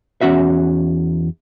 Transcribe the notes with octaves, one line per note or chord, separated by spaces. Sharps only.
E2 C#4 F#4 E5